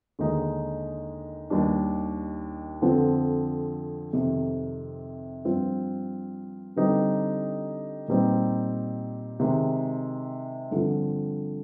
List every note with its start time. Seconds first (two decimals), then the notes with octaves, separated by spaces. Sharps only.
0.19 D#2 D3 G#3 D#4
1.50 D#2 D#3 G3 D4
2.82 F2 D3 F3 C4
4.13 F2 C3 D#3
5.45 G2 F3 C4 F4
6.76 D3 G3 C4 D#4
8.08 A#2 G3 C4 D#4
9.40 C3 D#3 G#3
10.71 G2 D3 F3 C4 F4